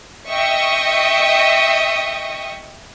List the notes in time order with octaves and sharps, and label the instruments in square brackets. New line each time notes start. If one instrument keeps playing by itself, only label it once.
[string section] D#5 E5 G5 C#6 D#6